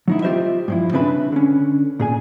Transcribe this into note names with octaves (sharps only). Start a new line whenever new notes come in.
F#3 D#4 E4
F4 G4 B4 C5 D#5 E5
G2 F3 E4
C#3 C4 D4 B4 E5 B5
D3 C#4
A#2 G#4 G#5